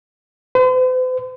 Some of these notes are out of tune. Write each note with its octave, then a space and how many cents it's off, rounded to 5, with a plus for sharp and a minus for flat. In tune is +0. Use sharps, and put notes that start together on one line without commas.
C5 -45